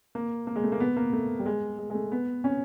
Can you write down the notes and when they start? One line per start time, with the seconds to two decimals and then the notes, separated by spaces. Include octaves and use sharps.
0.15 A#3
0.47 A#3
0.56 G#3
0.64 A3
0.72 A#3
0.80 B3
0.97 A#3
1.13 A3
1.39 G3
1.46 G#3
1.79 G#3
1.90 G#3
1.94 A3
2.12 B3
2.44 C#4